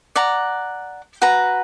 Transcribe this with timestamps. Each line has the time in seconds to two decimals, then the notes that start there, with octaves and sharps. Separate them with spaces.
0.16 D5 F#5 A#5
1.22 F#4 B4 F#5 A#5